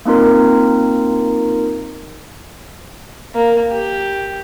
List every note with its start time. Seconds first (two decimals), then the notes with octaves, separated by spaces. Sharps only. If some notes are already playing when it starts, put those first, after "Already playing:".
0.05 A#3 C4 D#4 F4 A#4
3.34 A#3
3.70 G4